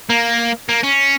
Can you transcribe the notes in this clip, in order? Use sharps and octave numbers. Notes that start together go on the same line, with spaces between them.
A#3
A#3
C#4